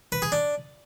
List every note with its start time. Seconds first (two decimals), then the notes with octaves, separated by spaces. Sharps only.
0.12 B4
0.22 G#4
0.32 D4